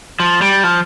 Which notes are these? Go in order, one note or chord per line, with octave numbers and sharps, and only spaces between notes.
F3
G3
F3